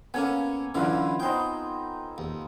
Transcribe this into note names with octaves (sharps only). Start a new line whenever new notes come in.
A#3 B3 C#4 A4 G#5
F#2 D3 E3 E4 F4 B4
B3 C4 D#4 G5 C6
D#2